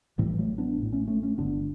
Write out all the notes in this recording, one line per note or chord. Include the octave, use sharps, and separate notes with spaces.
A1 A2 E3 G3
F#3 A3
B3 D4
A1 A2
A3 C#4
A3 C#4
A3 C#4
G1 G2 D3 B3 D4